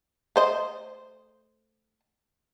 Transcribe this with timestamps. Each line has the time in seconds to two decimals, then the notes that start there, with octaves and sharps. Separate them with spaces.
0.36 A3 C5 D#5